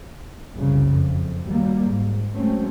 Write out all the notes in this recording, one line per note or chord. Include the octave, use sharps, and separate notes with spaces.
F#1 C2 C#3
F2
D#2 F#3 G3 A#3
G#2
F#3 G#3 A3 C4 C#4